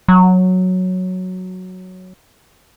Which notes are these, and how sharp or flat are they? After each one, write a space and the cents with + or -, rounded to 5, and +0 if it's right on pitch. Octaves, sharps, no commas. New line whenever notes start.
F#3 -5